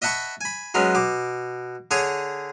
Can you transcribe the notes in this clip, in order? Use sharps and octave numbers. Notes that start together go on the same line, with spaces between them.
D#5 E5 F#5 A5 B5 C#6
G#5 B5
F#3 G#3 B3 C#4
B2 D6
D3 G#4 C#5 C#6 D#6